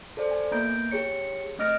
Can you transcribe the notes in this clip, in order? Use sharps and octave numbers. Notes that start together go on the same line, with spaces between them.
A4 C5 D5
G#5
A#3 B3 A#5 G6 D7
G4 G#4 C#5 C#7
A3 C4 D#5 F6 A#6 D7